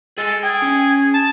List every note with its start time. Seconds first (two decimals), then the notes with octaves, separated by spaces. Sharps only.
0.18 G#4 A4 D#5
0.43 G#4 G5
0.62 C#4
1.14 A5